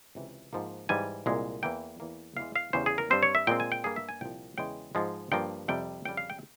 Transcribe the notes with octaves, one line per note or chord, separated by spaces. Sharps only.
C#2 C3 E3
G#2 F3 A#3
G#2 E3 G3 G#5
C2 A#2 G#3
E2 E3 A#3 G5
E2 E3 A#3
E2 E3 G#3 F5
F5
E2 C#3 G3 C5
G#4
A#4
G2 G3 C4 C5
C#5
E5
A#2 G#3 C4 G5
G#5
G5
G2 G3 A#3 G#4
E5
G#5
C2 A#2 F3 G5
E2 C#3 E3 G#3 G5
G#2 F3 G#3
G2 F3 A#3 G5
F2 C3 G3 G5
F2 C#3 G3 G5
F5
G5